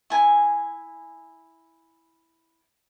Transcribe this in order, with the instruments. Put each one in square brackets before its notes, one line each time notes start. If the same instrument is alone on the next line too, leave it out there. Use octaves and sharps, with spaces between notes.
[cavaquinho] E4 G#5